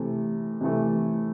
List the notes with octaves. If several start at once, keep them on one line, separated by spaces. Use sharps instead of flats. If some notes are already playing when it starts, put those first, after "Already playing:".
Already playing: C3 E3 A3
C3 E3 A3